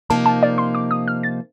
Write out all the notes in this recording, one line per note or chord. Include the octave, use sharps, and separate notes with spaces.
C3 F3 A#3 D#4 A5
A5
D5
C6
D6
D#6
F6
A6